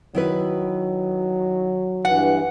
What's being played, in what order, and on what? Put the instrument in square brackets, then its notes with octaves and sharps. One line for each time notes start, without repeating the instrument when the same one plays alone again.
[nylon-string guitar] D#3 E4 B4 [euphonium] F#3
[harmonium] G2 E3 [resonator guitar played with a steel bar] F#5